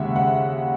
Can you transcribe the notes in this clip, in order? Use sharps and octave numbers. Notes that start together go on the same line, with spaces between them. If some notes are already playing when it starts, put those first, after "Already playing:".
Already playing: D#2 C#3 G#3 E5 F#5
F#5